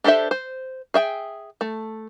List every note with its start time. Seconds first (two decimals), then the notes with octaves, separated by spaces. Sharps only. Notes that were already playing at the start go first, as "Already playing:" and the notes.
0.04 D4 G4 A4 C5 E5
0.31 C5
0.94 G#4 E5 G5
1.61 A3